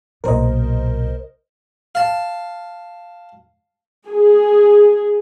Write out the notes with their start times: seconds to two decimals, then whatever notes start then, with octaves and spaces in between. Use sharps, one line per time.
0.24 B1 A#2 A#4 C5 D#5
1.95 F5 A5
4.08 G#4